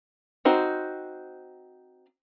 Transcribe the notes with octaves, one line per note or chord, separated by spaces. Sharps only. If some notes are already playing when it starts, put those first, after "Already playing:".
C4 D#4 F#4 C5